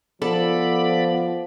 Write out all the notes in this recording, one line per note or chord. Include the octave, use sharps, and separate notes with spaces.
F3 B3 A4 D5 B5